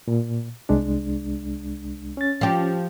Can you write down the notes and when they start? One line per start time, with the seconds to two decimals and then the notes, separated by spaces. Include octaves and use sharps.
0.08 A#2
0.69 C2 G#3 D4
2.17 C#4 A6
2.41 F3 G4